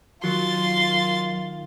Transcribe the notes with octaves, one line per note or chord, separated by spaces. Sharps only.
D#3 F#3 F4 C6 A6